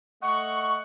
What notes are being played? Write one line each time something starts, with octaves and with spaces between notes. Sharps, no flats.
A3 D#5 F#5 C#6